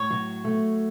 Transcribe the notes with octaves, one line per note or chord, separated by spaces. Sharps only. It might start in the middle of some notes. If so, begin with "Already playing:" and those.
Already playing: A2 C#5
F#3
A3